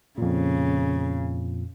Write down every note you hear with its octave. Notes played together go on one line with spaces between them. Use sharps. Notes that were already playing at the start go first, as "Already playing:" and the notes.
F2 A#2 C#3